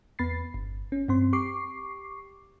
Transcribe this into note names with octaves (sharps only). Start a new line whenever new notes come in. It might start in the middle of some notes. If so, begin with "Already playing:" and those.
E2 B3 B5 A6 C7
G1
C#4
G2 C4 C6
G4 C#6 D6 C7